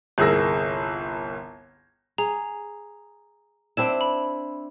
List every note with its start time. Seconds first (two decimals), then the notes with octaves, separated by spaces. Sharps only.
0.18 G1 C2 G#4 A#4 E6 A#6
2.18 G#4 A#5
3.77 C4 D4 E4 E7
4.01 B5